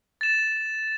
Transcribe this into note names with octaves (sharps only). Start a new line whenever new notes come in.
A6 E7